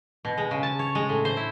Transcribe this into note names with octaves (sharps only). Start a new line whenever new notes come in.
B2
G#3
C#3
A5
C#5
G#3
A2
C5
E4